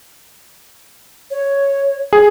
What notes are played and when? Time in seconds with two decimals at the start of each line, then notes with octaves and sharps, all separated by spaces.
1.31 C#5
2.13 G#4